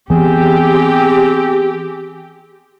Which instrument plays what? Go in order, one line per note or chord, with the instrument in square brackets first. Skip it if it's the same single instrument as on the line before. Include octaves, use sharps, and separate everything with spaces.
[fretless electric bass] E3 B3 [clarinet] C4 [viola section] G4 [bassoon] G#4